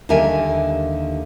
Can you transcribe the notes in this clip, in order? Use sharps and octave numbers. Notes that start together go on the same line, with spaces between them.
D#2 D3 G3 A#4 E5 G#5